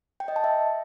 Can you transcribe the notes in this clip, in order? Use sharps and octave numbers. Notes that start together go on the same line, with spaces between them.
G5
D#5
A5
E5